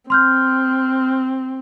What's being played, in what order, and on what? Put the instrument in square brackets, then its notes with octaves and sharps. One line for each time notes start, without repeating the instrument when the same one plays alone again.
[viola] C4 [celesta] C6 F6 G6